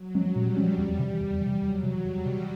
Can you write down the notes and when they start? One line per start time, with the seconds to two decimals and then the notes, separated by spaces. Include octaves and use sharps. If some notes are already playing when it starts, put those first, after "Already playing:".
Already playing: F#3
0.15 F3 G#3 C#4
0.36 A#2 G3
0.57 F3 G#3 C#4
0.78 E2
0.99 C3 E3
1.20 E2
1.41 C3 E3
1.62 E2 F#3
1.83 C3 E3
2.04 E2 G3
2.26 C3 E3